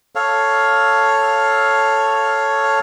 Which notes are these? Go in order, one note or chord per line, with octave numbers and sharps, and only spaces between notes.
A4 C#5 F5